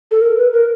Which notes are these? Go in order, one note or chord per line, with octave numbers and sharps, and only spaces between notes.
A4
A#4
B4
A#4